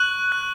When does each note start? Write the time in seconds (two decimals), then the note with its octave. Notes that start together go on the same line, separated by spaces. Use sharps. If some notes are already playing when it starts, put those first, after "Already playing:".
Already playing: C#6 F#6 F#7
0.32 F#6